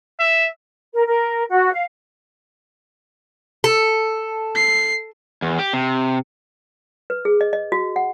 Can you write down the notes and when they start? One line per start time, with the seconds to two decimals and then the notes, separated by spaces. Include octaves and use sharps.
0.20 E5
0.93 A#4
1.06 A#4
1.49 F#4
1.72 F5
3.64 A4
4.55 C7
5.42 E2
5.59 G4
5.73 C3
7.10 B4
7.25 G#4
7.41 D#5
7.53 D#5
7.72 F#4
7.96 F#5